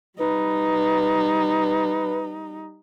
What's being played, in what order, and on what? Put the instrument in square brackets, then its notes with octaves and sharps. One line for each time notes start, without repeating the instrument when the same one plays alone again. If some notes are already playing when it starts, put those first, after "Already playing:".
[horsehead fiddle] G3 D#4 [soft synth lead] B4